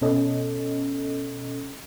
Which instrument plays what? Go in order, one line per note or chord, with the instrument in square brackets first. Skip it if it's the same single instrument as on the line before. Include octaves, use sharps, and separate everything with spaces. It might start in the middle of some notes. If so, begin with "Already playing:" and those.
[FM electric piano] B2 C#4 A4 D#5